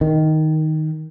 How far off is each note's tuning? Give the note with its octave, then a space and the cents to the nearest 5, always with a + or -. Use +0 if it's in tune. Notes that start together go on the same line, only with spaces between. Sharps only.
D#3 +5